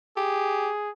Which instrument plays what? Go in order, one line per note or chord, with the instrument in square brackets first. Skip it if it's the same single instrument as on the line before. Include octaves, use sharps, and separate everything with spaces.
[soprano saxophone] G4 [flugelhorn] G#4